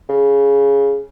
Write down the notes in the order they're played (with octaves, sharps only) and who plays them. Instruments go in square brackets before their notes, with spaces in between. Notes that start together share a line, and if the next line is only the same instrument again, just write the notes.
[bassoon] C#3